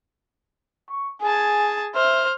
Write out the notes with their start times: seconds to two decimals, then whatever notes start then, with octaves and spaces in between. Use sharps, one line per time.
0.90 C#6
1.22 G#4 G#5 A5
1.95 C5 E5 F6